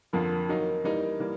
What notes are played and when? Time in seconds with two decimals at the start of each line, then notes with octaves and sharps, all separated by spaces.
0.13 F2 D3 F3 A#3
0.49 D#3 F#3 A#3 D#4
0.84 E3 G3 A#3 D#4
1.20 E3 G3 A#3